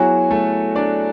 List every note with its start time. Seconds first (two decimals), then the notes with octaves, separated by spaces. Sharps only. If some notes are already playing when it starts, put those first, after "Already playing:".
Already playing: F#3 B3 E4 F#4 G#4 C#5 G#5
0.31 A3 A4
0.76 D4 D5